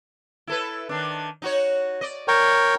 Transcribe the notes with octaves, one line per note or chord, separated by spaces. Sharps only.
E4 A4 B4
D#3 D4
D#4 F#4 C#5
D5 D#5
A#4 C#5 G5